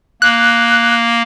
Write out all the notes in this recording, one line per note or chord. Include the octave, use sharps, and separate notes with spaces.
A#3 F#6